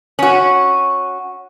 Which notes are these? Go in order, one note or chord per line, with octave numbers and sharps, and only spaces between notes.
C#4 F#4